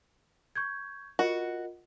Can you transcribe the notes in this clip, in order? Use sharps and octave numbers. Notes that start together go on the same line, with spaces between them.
C#6 G6 G#6
F4 F#4 A#4 D#5